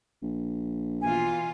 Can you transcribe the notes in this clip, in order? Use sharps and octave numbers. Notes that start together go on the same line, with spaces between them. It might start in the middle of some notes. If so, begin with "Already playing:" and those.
A#1
B2 E3 F4 G#5